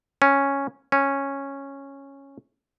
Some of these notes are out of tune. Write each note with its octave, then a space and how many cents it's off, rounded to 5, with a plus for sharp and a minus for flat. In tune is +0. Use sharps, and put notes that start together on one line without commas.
C#4 -5
C#4 -10